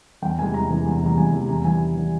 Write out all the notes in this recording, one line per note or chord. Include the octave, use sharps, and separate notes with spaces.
E2 G5
C3 E3 G#3 G#5
E2 A#5
C3 E3 G#3
E2
C3 E3 G#3 A#5
E2 G#5
C3 E3 G#3
E2 A#5
E3 G3 G#5
E2
E3 G3